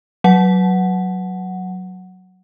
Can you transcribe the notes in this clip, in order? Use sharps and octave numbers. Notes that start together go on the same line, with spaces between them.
F#3 F#5